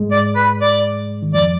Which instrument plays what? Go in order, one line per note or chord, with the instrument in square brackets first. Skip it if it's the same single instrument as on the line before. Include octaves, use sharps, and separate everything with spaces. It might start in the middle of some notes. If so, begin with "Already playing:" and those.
Already playing: [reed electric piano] G#2 G#3
[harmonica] D5
B4
D5
[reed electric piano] D#3
[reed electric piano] F2 F3 [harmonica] D5